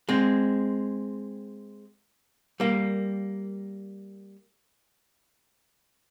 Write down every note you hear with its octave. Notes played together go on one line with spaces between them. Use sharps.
G#3 C4
G3 A#3